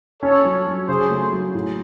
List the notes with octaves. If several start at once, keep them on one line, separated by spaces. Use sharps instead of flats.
C#4 A4 C#5
F#3
F#3
C#3 G#4 C5
A3
F#3
A2